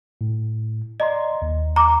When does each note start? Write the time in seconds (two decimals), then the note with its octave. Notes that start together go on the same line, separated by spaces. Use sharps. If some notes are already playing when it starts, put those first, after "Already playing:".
0.21 A2
1.00 D5 D#5 A#5 C6
1.42 D#2
1.76 A#5 D6